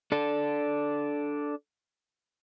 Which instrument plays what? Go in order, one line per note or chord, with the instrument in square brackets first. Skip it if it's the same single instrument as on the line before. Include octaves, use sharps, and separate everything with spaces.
[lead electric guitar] D4 A4